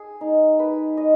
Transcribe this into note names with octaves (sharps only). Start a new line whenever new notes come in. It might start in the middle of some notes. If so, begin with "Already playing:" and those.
Already playing: G#4
D#4
B4
D#5